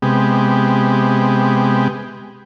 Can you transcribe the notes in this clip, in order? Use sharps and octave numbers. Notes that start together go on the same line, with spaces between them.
C3 G#3 B3 G4